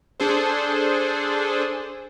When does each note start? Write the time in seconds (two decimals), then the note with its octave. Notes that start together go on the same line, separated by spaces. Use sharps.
0.20 D4 G#4 A4 C5